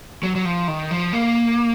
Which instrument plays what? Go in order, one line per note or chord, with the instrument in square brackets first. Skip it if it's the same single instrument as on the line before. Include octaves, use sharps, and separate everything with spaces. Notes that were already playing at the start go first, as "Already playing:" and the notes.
[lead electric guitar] F#3
F#3
F3
D#3
F3
A#3